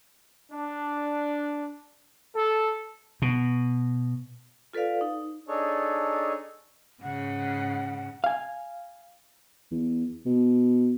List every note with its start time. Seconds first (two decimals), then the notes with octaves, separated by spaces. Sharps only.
0.51 D4
2.35 A4
3.22 B2
4.73 F4 A4 B4 D5 F5
5.01 D#4
5.48 D4 D#4 G#4 A4 C#5
7.03 G#2 C#3 F#5
8.24 F5 G#5
9.71 E2
10.26 B2